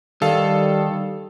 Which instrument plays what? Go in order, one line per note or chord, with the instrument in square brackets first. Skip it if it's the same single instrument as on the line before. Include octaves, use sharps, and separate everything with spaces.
[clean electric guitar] D#3 [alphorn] G3 [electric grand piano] A4 F5